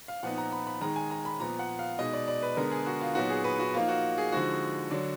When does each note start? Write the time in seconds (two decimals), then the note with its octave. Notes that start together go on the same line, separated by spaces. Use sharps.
0.08 F5
0.23 A#2 F3 B3 D#4 F#5
0.38 A#5
0.52 B5
0.67 B5
0.81 D#3 G#3 D#4 A#5
0.96 G#5
1.11 A#5
1.25 B5
1.40 A#2 F3 B3 A#5
1.59 F#5
1.79 F5
1.99 B2 G#3 D#4 D#5
2.13 D5
2.28 D5
2.43 B4
2.57 D3 G#3 B3 D4 A#4
2.71 G#4
2.86 F#4
3.01 F4
3.15 A#2 F#3 B3 D#4 F#4
3.30 G#4
3.44 B4
3.59 F#4
3.74 F3 A#3 D#4 F4
3.88 F#4
4.18 G#4
4.32 D3 F3 G#3 D#4 F#4
4.91 D3 F#3 D4